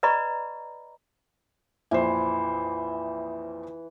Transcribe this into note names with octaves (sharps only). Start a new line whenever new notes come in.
B4 D5 D#5 A#5 B5 C#6
A#1 F2 E3 C5